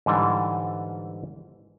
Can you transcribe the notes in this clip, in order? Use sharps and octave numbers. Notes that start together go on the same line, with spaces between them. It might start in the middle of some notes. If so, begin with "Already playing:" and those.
G#2 D3 E3 G3 D5